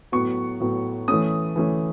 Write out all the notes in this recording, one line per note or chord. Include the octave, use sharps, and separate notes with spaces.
A2 F#3 B3 C#6
A2 F#3 B3
E3 A3 C#4 D#6
E3 A3 C#4